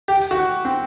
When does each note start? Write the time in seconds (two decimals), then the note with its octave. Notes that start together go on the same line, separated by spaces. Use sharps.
0.08 G4
0.31 F#4
0.65 C4